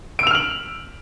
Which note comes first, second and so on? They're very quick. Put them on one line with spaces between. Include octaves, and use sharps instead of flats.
D7 E6 F7 F6 F#7